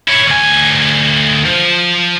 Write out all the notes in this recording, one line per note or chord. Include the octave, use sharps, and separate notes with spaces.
E4 C#5
D2 G#5
F3